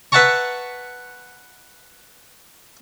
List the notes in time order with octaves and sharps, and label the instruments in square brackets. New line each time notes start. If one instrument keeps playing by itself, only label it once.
[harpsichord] B4 E5 F#5 A5 A#5 C#6